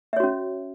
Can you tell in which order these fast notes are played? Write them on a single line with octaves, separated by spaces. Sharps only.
E5 C#5 F#4 C#4